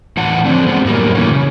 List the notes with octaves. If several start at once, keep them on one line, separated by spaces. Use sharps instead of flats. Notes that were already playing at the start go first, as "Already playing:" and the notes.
A2 E3 F#5 A5
D3 F3 C4 D4
G#3 B3 C4
F#2 A2 G3 A#3
B2 D3 E3 A#3 C#4
C#3